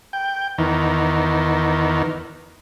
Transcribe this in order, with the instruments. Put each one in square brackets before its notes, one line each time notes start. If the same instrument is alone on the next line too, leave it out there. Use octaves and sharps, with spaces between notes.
[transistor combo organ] G5
E2 D#3